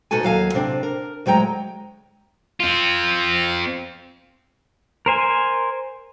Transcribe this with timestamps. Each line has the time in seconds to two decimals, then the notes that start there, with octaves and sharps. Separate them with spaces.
0.11 B2 D#4 F#4 A4 G#5
0.23 D#2 F#3 F5 G#5
0.54 C3 C4 D4
0.83 A#4
1.26 D2 F#3 G#3 G5 A#5
2.60 C4 F4
5.06 A#4 C5 G#5